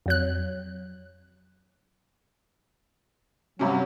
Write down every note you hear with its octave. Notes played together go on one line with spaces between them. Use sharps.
F2 F#3 F#6
G2 C3 F#3 C#4